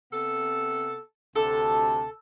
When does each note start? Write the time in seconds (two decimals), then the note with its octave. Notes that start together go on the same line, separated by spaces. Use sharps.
0.12 C3 B3 A4
1.36 D2 C3 A4